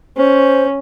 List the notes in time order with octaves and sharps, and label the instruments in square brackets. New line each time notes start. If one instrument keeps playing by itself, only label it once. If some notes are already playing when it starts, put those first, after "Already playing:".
[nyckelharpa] C#4 [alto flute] C5